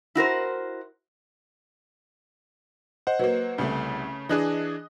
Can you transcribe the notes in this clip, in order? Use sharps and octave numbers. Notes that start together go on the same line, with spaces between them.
E4 F#4 A#4 C5
C5 D#5 F#5
F#3 A#3 B4
C2 C#3 A3
E3 D4 G#4 D#5 F#6